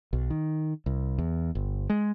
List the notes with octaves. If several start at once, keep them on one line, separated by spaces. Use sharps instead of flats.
B1
D#3
C2
E2
G1
G#3